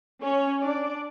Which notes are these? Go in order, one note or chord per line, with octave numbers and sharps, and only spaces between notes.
C#4 C#5
D4 D5